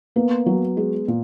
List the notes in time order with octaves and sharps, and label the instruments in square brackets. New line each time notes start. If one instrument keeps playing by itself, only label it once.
[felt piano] A#3 [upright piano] B3
[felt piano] F#3
G#3
A#2